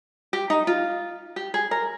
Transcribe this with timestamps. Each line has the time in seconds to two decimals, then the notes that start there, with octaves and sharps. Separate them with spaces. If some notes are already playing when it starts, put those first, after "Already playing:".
0.33 G4
0.50 D#4
0.67 F4
1.36 G4
1.54 G#4
1.71 A#4